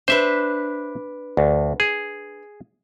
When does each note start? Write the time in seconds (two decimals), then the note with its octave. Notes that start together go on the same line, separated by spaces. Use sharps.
0.08 D4 B4 C5 E5
1.37 D2
1.80 G#4